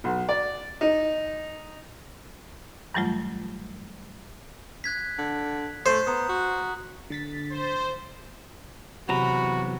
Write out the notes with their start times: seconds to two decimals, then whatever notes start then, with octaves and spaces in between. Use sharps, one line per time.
0.04 B1
0.29 D5
0.81 D#4
2.94 G2 E3 F#3 G3 A3 F4
4.84 F#6 G#6 B6
5.18 D3
5.86 A3 C5
6.07 B3 A#5 D#6
6.29 F#4
7.10 D3 A6 B6
7.51 C5
9.09 E2 C3 F#3 F#4 A#5 B5